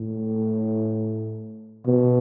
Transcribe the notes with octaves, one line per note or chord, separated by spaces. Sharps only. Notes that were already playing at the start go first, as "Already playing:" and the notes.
Already playing: A2
B2